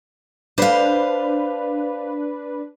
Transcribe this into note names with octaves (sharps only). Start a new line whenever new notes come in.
D4 B4 C5 F5